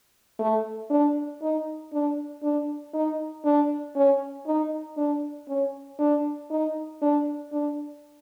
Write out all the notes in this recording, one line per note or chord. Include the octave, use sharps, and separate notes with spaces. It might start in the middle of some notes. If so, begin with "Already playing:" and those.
A3
D4
D#4
D4
D4
D#4
D4
C#4
D#4
D4
C#4
D4
D#4
D4
D4